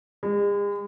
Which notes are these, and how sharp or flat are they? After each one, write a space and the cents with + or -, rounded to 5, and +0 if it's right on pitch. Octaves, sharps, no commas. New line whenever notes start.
G#3 -40